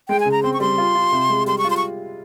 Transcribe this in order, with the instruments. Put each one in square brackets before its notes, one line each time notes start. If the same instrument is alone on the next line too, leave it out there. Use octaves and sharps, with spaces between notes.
[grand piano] G#3 [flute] G5
[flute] G#5
[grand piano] C#3
[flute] A#5
[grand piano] C4 [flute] C6
[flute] C#6
[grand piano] G3 [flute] C6
[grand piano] F4
F4
C3
G#3
[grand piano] G3 [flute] C6
[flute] C#6
[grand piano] F4
[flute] C6
C#6